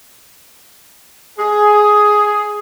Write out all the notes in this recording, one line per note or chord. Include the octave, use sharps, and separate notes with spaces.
G#4